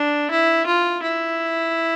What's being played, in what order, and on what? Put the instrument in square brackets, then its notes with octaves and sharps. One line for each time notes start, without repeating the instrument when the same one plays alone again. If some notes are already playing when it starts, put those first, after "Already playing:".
Already playing: [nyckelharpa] D4
E4
F4
E4